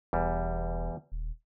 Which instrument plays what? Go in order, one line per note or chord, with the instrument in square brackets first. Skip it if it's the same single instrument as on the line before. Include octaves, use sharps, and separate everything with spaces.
[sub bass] E1 [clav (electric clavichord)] E2 G3
[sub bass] D#1